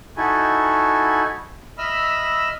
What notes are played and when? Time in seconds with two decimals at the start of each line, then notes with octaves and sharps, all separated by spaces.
0.17 D#4 E4 F#4 A4 G#5
1.78 D#5 E5 B5 E6 F6